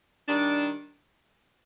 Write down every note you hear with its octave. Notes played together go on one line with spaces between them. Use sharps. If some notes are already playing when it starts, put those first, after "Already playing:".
D#3 G3 D4